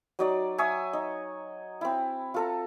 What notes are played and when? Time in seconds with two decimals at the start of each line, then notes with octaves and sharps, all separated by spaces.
0.19 F#3 D#4 D5
0.58 E5 G#5 C#6 D#6
0.93 D#4
1.81 C4 E4
2.34 F4 A4 A#5